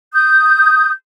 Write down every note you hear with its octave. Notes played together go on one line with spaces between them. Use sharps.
D#6 G6